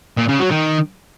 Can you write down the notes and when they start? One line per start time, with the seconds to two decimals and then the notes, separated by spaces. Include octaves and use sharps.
0.17 A#2
0.28 C#3
0.39 F#3
0.51 D#3